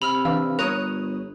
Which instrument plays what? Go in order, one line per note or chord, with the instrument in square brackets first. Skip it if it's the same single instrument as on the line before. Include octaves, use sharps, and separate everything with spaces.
[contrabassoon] C3 [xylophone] B5 E6 F6 [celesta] F7
[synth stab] E3 D4 [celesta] B4 F5 [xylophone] E6
[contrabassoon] G1 [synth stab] A#4 C#5 D#6 [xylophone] F#6 [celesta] F7